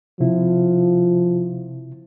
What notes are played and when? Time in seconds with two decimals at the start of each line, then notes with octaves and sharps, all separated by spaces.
0.20 C3 F3 E4